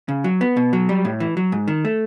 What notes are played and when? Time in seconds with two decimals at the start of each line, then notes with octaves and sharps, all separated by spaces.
0.08 C#3
0.24 F#3
0.41 B3
0.57 B2
0.73 F#3
0.89 G3
1.05 A2
1.20 E3
1.37 F#3
1.52 G#2
1.68 D#3
1.85 A3